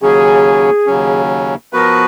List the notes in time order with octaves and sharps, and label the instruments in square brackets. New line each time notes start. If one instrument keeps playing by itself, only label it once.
[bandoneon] D#2 C#3 F#3 C#4 [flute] G#4
[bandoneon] D#2 C#3 F#3 C#4
[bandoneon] F3 B3 F#4 B4 [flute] A#4